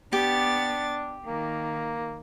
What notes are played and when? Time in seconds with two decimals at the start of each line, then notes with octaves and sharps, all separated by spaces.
0.13 B3 D4 G4 A6
1.26 D#3 A#3